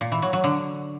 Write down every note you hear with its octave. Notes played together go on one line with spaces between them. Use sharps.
A#2
E3
F#3
F#3
D3